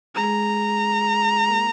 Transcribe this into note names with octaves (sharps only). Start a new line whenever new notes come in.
G#3 G#4 A#5
A#3 A#4